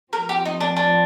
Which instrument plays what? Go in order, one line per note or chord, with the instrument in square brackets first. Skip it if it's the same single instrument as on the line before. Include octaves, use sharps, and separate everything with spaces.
[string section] A2 F3 C4 [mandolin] A#4
[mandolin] G4
D#4
D4
D4